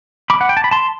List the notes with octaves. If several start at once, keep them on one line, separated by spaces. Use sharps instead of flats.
B5 D6
F#5
G5
A5
B5
A5 C6